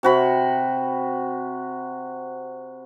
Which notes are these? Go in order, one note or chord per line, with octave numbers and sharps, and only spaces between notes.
C3 F#4 B5